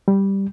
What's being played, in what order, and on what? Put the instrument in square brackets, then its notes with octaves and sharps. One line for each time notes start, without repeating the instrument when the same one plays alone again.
[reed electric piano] G3